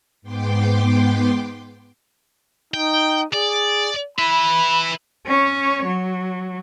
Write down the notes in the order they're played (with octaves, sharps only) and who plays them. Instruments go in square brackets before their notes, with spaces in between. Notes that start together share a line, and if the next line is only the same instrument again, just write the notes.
[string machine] G#2 B3 G5 C6 D6
[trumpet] D#4 [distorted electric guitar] G5
[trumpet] G#4 [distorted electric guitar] D5
[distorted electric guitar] E4 B4 [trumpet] B5
[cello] C#4 C#5
F#3